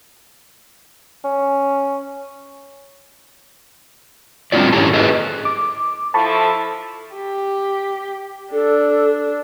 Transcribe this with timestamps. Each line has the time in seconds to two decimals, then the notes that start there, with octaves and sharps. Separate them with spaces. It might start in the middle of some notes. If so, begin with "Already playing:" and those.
1.24 C#4
4.52 G3 C4 D4 F4 F#4 D5
4.73 G#2 C#4 E4 G4 A4 A5
4.93 G#4 A4 B4 D#5
5.45 D6
6.14 F3 E4 A4 A5 B5 C#6
7.15 G4
8.52 D4 A4